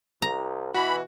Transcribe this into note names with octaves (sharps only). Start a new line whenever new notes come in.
C2 A#5
B2 E3 F#4 B5